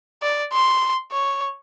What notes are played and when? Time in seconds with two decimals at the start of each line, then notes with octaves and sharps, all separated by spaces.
0.22 D5
0.53 C6
1.12 C#5